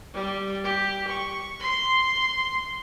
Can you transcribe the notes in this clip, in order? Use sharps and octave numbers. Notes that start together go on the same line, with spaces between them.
G3
G4
C#6
C6